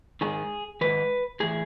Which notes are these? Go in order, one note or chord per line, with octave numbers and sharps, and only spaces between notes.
G#2 D#3 G#4
G#2 D#3 B4
A2 E3 G#4